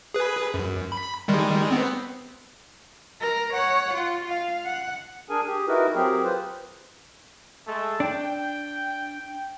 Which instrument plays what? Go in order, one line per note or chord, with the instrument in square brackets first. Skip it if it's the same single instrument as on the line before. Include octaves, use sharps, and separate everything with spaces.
[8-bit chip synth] G#4 B4
F#2
B5
D#3 G3 G#3
B3 C4
[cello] A#4
C#5 F#5
F4
F5
F#5
[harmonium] D4 G#4 A#4 G#5
G4 G#4
D#4 E4 F#4 A#4 B4
F#3 C4 G4 G#4 A#4
F4 B4 C5
[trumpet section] G#3 A3 A4
[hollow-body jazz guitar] D4 [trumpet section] G5